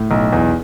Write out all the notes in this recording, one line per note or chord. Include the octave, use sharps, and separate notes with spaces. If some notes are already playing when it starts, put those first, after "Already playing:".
Already playing: A2
B1
E2